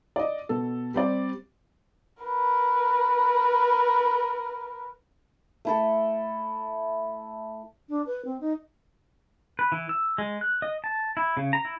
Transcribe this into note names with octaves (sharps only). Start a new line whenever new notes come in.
D5 D#5
B2 A4
G3 C4 D5
A#4 B4
A3 E4 A4
D4
B4
C4
D#4
B4
E3
E6
G#3
F#6
D#5
A5
E4
C#3
A#5
E4